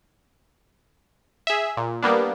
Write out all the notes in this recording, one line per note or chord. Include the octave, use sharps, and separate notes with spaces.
G#4 E5
A#2
G3 A#3 B3 D4